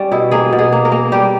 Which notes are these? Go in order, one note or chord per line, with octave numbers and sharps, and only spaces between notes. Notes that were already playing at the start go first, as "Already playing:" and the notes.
Already playing: G3 C#4
B2 E4
A#3 G#4
B2
G#4
A#3
A#4
A#3
G3 G4